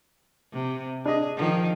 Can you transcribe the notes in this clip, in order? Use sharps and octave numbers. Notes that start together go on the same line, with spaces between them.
C3
D4 G#4 D#5
D#3 F3